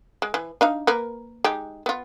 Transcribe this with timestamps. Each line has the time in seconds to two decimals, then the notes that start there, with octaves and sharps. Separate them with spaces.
0.22 G#3
0.34 E3
0.61 D4 D#4 F5
0.87 A#3 A#4 B4
1.44 G#3 D#4 G4
1.86 B3 F4